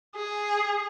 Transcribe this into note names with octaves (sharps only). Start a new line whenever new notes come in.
G#4